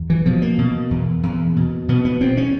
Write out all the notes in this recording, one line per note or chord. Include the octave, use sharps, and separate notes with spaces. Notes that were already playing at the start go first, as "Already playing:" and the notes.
Already playing: E2
E3
B2 F3
A#3
B2
E2
E2
B2
B2 B3
B3
E2 C4
C#4